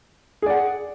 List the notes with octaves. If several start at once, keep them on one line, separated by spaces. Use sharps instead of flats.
G#4 D5 F#5